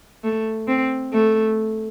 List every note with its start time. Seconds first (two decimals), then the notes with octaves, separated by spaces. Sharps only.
0.24 A3
0.68 C4
1.13 A3